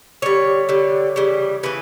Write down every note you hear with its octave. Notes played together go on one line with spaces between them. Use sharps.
D3 G3 C#5
D3 G3
C#3 E3 G3
C#3 E3 B4